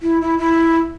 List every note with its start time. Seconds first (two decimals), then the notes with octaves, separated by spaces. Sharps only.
0.02 E4
0.21 E4
0.38 E4